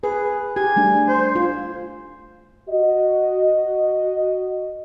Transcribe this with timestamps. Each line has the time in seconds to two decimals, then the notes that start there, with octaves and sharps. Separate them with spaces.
0.04 G#4 B4
0.56 G4 G#5
0.76 G3 A3 D4
1.08 C5
1.35 F4
2.69 F#4 D#5